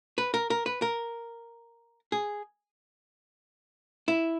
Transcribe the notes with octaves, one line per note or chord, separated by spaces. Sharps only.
B4
A#4
A#4
B4
A#4
G#4
E4